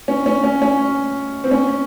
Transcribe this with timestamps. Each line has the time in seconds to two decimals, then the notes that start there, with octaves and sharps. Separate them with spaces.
0.08 C#4
0.26 C#4
0.44 C#4
0.62 C#4
1.44 C4
1.51 C#4